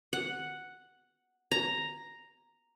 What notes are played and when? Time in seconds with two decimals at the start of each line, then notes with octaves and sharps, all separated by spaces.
0.13 F#5
1.52 A#5